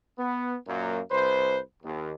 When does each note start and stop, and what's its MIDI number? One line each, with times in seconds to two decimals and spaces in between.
0.18 0.55 59
0.68 1.00 42
0.68 1.00 46
0.68 1.00 54
0.68 1.00 58
1.11 1.59 36
1.11 1.59 71
1.11 1.59 72
1.83 2.13 39